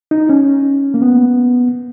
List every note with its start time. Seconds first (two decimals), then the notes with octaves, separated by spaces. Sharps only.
0.11 D#4
0.29 C#4
0.94 A#3
1.02 B3